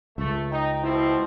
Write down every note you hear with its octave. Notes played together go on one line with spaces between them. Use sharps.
C#2 A3 E5
D#4 G5
B2 F3 C4 E4